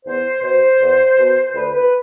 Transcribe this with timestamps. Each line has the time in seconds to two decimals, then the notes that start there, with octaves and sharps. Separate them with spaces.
0.06 E2 C5
0.42 B2 C5
0.80 E2
1.18 B2
1.55 D2 B4
1.74 B4